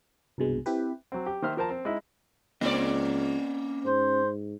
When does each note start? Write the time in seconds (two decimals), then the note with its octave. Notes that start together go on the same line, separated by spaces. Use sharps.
0.38 C2 G2 B2 G#3
0.66 C4 E4 G4 B4
1.12 F#3 C4
1.26 G4
1.42 D#3 A#3 C5 E5 F6
1.57 F3 A#4 C5 A5 A#5
1.70 C4
1.85 G#3 D#4 E4
2.61 C#2 A#3 C4 C#4 D5 D#5
3.85 G#2 C5